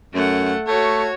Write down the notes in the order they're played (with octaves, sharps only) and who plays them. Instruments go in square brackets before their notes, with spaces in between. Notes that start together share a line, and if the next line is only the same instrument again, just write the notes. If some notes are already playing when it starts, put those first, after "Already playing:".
[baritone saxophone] F#2 [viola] A3 F#5
[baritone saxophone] A3 [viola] F#4 C#5